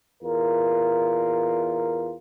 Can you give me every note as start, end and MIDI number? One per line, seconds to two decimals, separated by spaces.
0.23 2.16 40
0.23 2.16 65
0.23 2.16 70